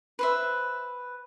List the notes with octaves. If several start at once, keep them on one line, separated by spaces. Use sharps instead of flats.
B4 C5 E5